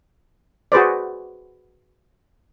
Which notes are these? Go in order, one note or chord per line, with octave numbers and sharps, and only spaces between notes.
F#4 G#4 B4 C5 D5